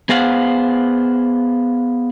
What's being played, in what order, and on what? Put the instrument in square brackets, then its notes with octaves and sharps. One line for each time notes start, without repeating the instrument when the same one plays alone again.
[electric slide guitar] B3 G#4 C5 F5 F#5